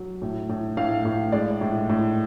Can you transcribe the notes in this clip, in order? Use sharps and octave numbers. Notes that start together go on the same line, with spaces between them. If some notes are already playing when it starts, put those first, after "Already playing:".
Already playing: F#3
A2
A2
A2 F5
A2
G#3 D5
A2
A2